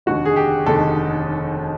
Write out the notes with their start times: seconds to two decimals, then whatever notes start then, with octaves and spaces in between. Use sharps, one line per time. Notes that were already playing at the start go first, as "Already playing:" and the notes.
0.06 F1 D#2 D3 F#4
0.25 G#4
0.36 G4
0.66 F1 D#2 D3 A4